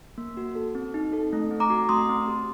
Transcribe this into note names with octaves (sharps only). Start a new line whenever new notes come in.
A#3
F#4
A4
C4
D#4
A4
A3
C4
A#5 D6
F#4
A3 C6 D#6
C4
G4